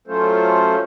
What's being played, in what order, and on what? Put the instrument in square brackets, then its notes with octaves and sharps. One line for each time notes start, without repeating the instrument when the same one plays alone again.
[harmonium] F#3 A3 C#4 F4 A4 C5